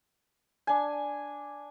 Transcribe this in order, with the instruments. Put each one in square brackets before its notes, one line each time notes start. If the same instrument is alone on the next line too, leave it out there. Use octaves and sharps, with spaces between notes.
[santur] D4 G#5